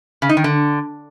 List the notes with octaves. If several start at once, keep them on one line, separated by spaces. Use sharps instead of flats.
C#3
D#4
D#3
D3